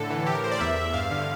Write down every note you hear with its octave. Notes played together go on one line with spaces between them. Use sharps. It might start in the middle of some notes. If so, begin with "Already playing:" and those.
Already playing: A2 D3 A4
E3
A2 G4
A#4
A2 C5
D5
E2 E5
E2
G2 F5
D3